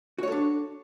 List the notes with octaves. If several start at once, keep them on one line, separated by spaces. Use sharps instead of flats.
D4 F#4 A4 C#5